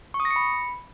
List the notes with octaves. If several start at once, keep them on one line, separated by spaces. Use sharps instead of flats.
C#6
D#6
A#6
C#7
B5